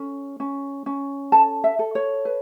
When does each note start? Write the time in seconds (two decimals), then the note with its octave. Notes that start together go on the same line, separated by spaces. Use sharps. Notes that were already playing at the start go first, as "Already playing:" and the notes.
Already playing: C#4 A4
0.40 C#4
0.86 C#4
1.32 A4 A5
1.64 E5
1.79 A4
1.95 C#5
2.25 B4